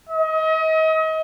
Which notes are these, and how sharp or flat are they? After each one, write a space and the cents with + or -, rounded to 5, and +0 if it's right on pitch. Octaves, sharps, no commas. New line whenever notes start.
D#5 +35